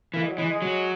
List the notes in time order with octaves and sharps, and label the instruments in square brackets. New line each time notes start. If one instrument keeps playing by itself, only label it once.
[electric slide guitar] E3 [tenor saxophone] A#3
[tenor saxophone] G#3
F#3
[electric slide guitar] E3 [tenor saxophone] G#3
[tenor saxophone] G#3
[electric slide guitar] F#3